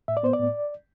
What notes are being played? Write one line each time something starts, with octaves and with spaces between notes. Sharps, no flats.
A2 E5
D5
B3 C5
D5
A2